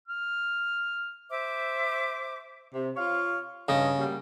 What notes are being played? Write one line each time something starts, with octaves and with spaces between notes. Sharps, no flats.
F6
C5 E5 D6
C3
F4 C#5 F5
G2 C#3 D#5
G3 A#3 F#4